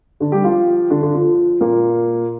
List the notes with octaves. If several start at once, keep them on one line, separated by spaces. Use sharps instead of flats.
D3 D4
G3 G4
F3 F4
D3 D4
D3
F3
A#2 A#3